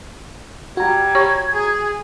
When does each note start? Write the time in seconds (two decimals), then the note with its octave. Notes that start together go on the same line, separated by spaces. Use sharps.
0.77 G3 F#4 A#5 G#6
1.15 G4 C#5 C#6
1.53 G#4